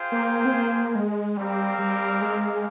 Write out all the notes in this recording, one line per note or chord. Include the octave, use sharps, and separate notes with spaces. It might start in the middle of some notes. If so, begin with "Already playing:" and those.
Already playing: F4 G#4 C5 G5
A#3
C4
A#3
G#3
G3 C4 G4 A#4 F5
G3
G#3